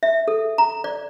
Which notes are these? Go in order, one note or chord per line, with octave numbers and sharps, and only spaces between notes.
E5
A4
A#5
D5